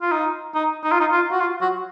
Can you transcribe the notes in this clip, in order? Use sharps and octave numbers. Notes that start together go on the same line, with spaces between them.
F4
D#4
D#4
D#4
F4
D#4
F4
F#4
F4
F#4